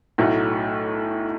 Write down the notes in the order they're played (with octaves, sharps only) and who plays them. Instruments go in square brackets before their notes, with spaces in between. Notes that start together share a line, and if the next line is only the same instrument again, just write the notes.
[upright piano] B1 A2 F#3 A3